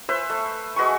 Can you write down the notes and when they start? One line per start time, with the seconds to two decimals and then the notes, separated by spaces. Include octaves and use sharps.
0.09 B4 C5 E5
0.30 A3
0.76 G#3 F#4 B4 C#6